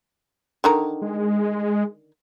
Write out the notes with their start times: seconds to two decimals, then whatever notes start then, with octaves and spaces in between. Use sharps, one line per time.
0.64 D3 D#3 A#5
1.02 G#3